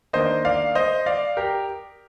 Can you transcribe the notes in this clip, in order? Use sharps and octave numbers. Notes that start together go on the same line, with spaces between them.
D#3 A#3 D4 C5 D#5
D5 F5
C5 D#5
D5 F5
G4 A#4